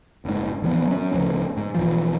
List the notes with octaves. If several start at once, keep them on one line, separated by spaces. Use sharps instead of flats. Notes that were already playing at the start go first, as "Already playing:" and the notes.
F#1 G#2
D1 E3 F3 B3
F#3 C#4
D1 D2 C#3 F3
G#2
B1 E3 F3